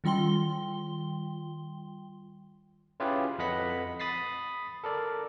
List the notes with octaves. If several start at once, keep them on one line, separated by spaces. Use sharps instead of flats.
D#3 G3 F4 G5 C6 G7
C#4 E4 F4 G4 G#4 B4
F2 B4 D#5 F#5 B5 B6
B5 D#6 A6 B6 C7
A4 A#4 D5